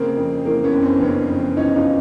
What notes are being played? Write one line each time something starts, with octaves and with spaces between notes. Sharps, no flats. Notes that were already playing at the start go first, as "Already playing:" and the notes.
Already playing: C#3 A#3 C4
F2
E3 A#3
B3 C#4
F#1
C4 D4
C#3 B3 C#4
F2
E3 C#4 D#4
D#4 F4